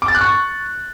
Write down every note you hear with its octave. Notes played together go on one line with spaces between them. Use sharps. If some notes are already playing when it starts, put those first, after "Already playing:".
D6
A6
F#6
C#6